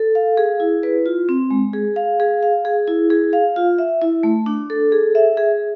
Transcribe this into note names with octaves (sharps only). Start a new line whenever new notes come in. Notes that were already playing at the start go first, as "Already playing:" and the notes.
Already playing: A4
F5
G#4
E4
B4
F4
C4
G#3
G#4
F5
G#4
F5
G#4
E4
G#4
F5
F4
E5
E4
A3
D4
A4
G#4
E5
G#4